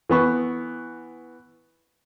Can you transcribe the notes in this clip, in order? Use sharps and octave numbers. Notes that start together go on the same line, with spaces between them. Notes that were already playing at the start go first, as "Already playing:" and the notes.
E3 B3 C#6